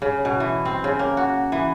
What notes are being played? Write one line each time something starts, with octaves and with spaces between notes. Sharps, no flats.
C#3
B2
E3
C4
C#3
A#3
F#4
E3